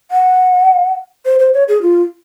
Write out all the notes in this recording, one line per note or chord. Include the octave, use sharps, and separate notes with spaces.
F#5
C5
C5
C#5
G#4
F4